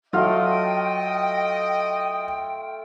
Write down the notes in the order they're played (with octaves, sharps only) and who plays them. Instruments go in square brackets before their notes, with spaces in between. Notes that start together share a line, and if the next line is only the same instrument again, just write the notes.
[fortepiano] F#3 F6 [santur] A3 F4 [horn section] D#5 [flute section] G5